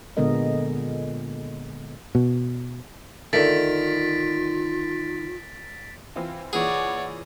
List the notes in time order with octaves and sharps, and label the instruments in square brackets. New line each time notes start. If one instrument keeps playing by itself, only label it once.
[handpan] A#2 D3 G#3 B3 A#4 D#5
[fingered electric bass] B2
[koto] D3 A3 [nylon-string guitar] D#3 [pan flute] F4 [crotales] A6 B6 D7
[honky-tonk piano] E3 C4 F4
[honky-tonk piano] A#2 E3 [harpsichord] G#4 [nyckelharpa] C#5 D5 [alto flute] F#5